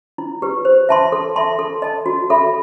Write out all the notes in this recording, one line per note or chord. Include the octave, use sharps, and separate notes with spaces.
E4
G4 B4
C5
E5 A5 C6
A4
E5 A5 C6
A4
D#5 A5
F#4
A4 E5 B5